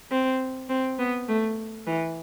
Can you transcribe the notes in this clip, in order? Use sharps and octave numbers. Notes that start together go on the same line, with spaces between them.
C4
C4
B3
A3
E3